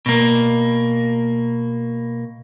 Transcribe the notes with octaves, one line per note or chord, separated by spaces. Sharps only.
B2 A#3